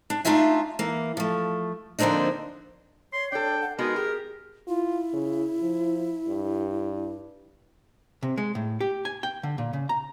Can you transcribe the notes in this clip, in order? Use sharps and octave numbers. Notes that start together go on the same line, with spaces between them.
D4
A3 D4 D#4 F4 E5 G#5
E3 A#3
F3 A3
D3 F3 A#3 C4 D4 D#4
C#5 C6
D4 A4 C#5 G5
F#5
G#3 B3 D#4 F#4 A#4
G4 G#4
E4 F4
C#3
F3
G2
C3
G#3
A2
G4
G#5
G5
D3
A#2
C#3
A#5